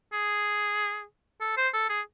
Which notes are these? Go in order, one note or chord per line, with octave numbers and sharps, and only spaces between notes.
G#4
A4
C5
A4
G#4